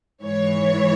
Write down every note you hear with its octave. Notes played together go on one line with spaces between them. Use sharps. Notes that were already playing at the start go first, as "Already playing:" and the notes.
G#2 E3 C#5